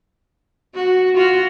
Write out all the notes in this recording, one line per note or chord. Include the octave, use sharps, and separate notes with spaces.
F#4
F4 F#4